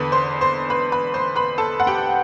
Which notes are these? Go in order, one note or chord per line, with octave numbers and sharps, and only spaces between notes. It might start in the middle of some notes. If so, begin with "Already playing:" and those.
Already playing: E2 D3 B4 B5
C5 C6
C5 C6
B4 B5
B4 B5
C5 C6
B4 B5
A4 A5
F#5
G4 G5